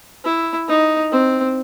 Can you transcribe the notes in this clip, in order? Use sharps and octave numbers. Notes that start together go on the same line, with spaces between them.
E4
D#4
C4